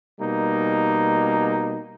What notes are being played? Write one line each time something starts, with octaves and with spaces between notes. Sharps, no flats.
B2 G3 A#3 D#4